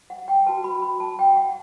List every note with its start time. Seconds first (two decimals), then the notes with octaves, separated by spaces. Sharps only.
0.10 F#5
0.28 G5
0.46 F#4 B4 A5
0.64 B5
0.82 B5
1.00 A5
1.19 G5
1.37 F#5